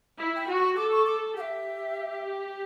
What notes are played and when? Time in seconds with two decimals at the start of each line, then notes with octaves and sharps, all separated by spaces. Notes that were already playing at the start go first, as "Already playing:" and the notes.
0.16 E4
0.36 G5
0.46 F#4
0.56 C#6
0.76 A4 D6
0.92 C#6
1.06 D6
1.37 G4 E5 F#5